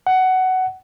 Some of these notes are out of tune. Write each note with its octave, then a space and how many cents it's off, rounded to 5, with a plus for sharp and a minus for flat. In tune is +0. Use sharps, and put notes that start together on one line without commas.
F#5 +15